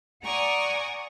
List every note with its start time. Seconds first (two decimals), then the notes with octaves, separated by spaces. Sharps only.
0.24 D5 F#5 G#5 A#5 C#6 D#6